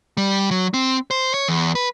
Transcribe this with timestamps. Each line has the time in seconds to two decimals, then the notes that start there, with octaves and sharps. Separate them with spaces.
0.17 G3
0.51 F#3
0.74 C4
1.11 C5
1.34 C#5
1.48 E2
1.75 B4